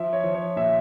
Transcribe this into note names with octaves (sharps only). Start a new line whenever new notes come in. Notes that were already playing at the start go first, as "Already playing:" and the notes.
Already playing: F3 E5
C#5
F3
C#5
A#2 E5